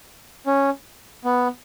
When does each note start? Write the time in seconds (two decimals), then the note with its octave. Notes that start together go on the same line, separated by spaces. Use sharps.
0.46 C#4
1.24 B3